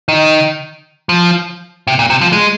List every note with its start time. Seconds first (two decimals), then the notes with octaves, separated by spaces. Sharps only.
0.08 D#3
1.09 F3
1.87 C3
1.99 A#2
2.10 C3
2.21 F3
2.32 G#3